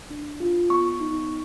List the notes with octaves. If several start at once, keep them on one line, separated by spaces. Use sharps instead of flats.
D4
F4
B3 C#6
D#4